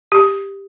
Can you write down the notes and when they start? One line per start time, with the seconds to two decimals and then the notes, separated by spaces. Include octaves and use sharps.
0.12 G4